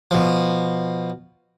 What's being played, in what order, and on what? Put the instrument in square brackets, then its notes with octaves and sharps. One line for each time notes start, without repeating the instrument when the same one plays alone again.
[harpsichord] B2 F3